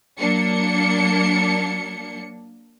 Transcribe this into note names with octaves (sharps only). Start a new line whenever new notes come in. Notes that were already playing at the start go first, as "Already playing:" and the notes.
F#3 A#3 D4 C#7